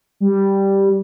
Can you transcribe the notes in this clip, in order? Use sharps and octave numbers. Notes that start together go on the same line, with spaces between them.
G3